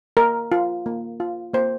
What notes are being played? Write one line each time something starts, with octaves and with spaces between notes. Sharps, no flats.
A#3 A#4
F4
A#3
F4
A#3 C5